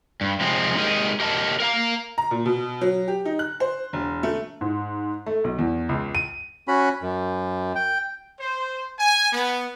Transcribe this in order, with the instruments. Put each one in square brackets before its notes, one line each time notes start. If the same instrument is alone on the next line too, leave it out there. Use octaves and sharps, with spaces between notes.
[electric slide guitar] G2
C3 F3 G#3 C4
G#3 D#4 G4 A#4 D#5
G4 A#4 D#5 A5
A#4 F5 A#5
[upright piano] A#5
A#2
B2
F#3
G4
D#4
F#6
C5
E1
A3
G#2
A3
B1
E2
C#2
D#7
[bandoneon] C#4 F#4 B5
F#2
G5
[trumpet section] C5
G#5
B3